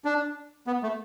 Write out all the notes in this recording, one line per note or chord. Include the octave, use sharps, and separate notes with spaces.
D4
B3
A3